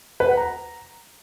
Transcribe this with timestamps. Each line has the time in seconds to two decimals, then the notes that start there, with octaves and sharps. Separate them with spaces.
0.20 B4
0.29 F#5
0.37 A#5